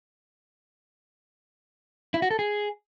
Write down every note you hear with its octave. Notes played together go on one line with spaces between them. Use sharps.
E4
F#4
A4
G#4